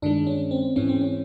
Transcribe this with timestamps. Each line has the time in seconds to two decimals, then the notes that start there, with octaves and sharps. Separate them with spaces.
0.02 G2 D#3 G#3 D4
0.27 C#4
0.51 C4
0.76 G#2 E3 G#3 C#4
0.89 C4
1.01 C#4